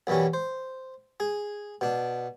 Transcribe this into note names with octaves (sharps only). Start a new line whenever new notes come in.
B1 F#2 E3 G3 C#4
C5
G#4
B2 D4